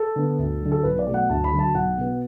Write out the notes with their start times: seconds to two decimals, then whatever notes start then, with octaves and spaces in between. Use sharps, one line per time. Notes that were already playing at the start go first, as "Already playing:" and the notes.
Already playing: A4
0.16 D3 B3
0.38 D2
0.62 D3 F#3
0.72 A4
0.83 B1 B4
0.99 D5
1.06 B2 F#3 A3
1.14 F#5
1.29 D2 A5
1.44 B5
1.52 D3 F#3
1.59 A5
1.74 B1 F#5
1.98 B2 B3